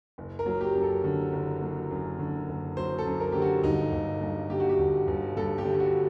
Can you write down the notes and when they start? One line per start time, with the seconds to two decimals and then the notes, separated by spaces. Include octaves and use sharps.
0.18 F#1
0.39 A#4
0.46 F#3
0.61 G4
0.75 F#2
0.82 A4
1.04 D3
1.33 F#1
1.62 F#3
1.91 F#2
2.19 D3
2.49 F#1
2.77 F#3 C5
2.98 A4
3.06 F#2
3.20 A#4
3.32 D3 G4
3.42 F#4
3.63 G1 D#4
3.92 G1
4.21 G2
4.50 D3 G4
4.60 F#4
4.69 G4
4.79 G1
5.08 G1
5.37 G2 A4
5.58 G4
5.65 D3
5.75 G4
5.80 F#4